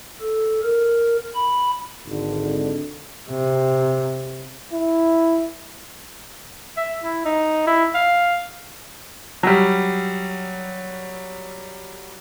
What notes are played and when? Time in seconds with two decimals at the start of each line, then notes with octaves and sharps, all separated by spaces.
0.21 A4
0.63 A#4
1.35 B5
2.07 G#1 D3
3.30 C3
4.72 E4
6.77 E5
7.04 E4
7.25 D#4
7.67 E4
7.95 F5
9.43 F#3 G3